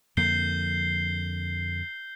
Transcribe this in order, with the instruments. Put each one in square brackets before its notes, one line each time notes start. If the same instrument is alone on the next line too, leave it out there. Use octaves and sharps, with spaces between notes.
[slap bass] F2 D3 A#3 [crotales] G6 C7 G7